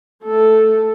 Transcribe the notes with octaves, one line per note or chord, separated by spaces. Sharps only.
A3 A4